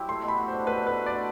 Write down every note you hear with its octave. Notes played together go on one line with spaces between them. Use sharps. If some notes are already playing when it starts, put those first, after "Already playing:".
Already playing: F#3 C4 E4 G4
A3 C6
B2
B5
F#4
D4 C5
A3 B4
B2 B4
F#4
D4 D5